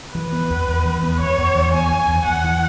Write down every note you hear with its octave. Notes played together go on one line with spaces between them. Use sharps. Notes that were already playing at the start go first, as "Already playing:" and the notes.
E3 B4
B3
E2
E2
E3
B3
E2 C#5
E2
E3
B3 G#5
E2
E2
E2 F#5
E3